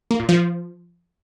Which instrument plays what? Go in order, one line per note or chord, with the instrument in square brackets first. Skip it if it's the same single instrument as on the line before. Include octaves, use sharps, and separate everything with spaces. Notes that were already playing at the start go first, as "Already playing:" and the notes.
[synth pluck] A#3
A#2
F3